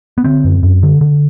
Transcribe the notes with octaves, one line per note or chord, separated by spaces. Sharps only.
B3
D3 C4
F#2
F#2
D3
D3